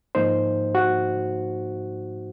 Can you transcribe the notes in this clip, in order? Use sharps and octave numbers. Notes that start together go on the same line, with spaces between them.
G#2 F3 A#3 D#4 C5
F#4